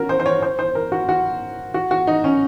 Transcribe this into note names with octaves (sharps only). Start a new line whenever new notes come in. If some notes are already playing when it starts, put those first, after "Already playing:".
Already playing: C#4 F#4 A#4
C5
C5
C#5
C5
C5
A#4
F#4
F#4
F#4
F#4
D#4
C#4